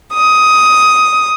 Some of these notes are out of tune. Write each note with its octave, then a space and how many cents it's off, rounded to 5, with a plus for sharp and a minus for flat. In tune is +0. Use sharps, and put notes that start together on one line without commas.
D#6 +10